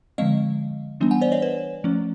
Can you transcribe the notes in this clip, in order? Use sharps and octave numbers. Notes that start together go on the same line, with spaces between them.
D3 F3 G#3 C4 D#5 F5
E3 G3 B3 D4
F#5 G#5
C5 D5
C#5 D#5
B4 C#5
F3 A3 C#4